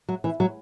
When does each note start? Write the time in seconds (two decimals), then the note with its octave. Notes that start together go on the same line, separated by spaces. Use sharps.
0.09 F#3
0.24 E3
0.40 F#3